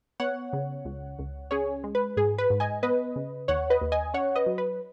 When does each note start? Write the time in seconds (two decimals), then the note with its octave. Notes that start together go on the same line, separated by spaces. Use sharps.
0.20 B3 C#5 F#5
0.53 C#3
0.85 C#2
1.19 C#2
1.51 C#4 G#4 C#5
1.84 G#3
1.95 B4
2.17 G#2 G#4
2.38 B4
2.50 G#2
2.60 D#5 G#5
2.83 B3 B4 D#5
3.16 C#3
3.48 D#2 C#5 F#5
3.70 B4 D#5
3.81 D#2
3.92 D#5 G#5
4.14 C#4 C#5 F#5
4.36 B4 D#5
4.46 F#3
4.58 B4